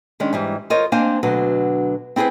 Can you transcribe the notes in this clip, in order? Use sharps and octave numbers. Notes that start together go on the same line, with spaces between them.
D#3 G#3 C#4 D4
G#2 E3 G3
F4 A#4 C5 C#5 D#5
A#3 C4 D4 C5 F5 G#5
D2 B2 F#3 D4 B4
C4 E4 G#4 B4 C5